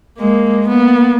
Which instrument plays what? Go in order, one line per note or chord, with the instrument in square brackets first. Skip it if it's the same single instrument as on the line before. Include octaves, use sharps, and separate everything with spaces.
[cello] G#3 [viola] A#3
[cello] A#3 [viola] B3